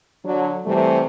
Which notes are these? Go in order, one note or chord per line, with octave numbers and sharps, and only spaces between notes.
D3 F#3
C3 E3 G3 A3